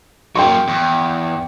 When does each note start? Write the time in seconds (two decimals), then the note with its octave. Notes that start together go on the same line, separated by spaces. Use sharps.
0.35 F#3 A#3 G5 C6 C#6
0.68 E2